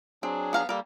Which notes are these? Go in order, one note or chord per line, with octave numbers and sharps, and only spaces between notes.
F#3 C4 D4 G#4
B3 F5 A#5
G3 A#3 A4 A#4